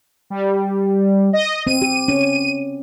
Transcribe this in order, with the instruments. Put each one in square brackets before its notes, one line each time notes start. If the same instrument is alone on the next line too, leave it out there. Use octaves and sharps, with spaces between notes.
[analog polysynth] G3
D#5
[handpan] C4 [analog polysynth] D#7
[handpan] G4
C#4